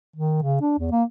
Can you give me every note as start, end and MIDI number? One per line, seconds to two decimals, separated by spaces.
0.16 0.41 51
0.42 0.57 49
0.61 0.75 62
0.79 0.91 40
0.91 1.03 58